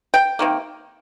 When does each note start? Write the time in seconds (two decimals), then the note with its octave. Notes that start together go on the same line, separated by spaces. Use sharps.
0.14 G5
0.39 C3 D#3 A#3